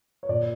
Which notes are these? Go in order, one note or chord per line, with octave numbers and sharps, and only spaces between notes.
C#5
A#2 D5